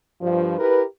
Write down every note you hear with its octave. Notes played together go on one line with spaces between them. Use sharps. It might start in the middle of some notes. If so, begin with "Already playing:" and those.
G2 F3
E4 G4 A#4 B4